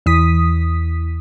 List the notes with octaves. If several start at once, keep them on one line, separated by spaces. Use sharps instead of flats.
E2 E3 D#6 B6